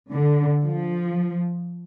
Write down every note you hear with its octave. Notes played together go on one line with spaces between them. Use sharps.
D3
F3